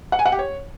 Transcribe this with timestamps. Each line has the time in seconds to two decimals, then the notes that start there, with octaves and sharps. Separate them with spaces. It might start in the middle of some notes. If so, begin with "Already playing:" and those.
0.12 F#5
0.19 G#5
0.26 F#5
0.32 G4
0.39 C#5